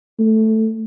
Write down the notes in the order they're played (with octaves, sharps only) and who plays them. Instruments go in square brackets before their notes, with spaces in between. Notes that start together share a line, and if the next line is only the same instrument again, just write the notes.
[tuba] A3